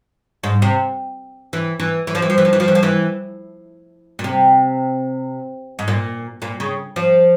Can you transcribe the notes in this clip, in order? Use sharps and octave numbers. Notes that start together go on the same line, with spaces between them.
G#2
C3
E3
E3
E3
F3
E3
F3
E3
F3
E3
F3
E3
F3
E3
A#2
C3
G#2
A#2
A#2
C#3
F3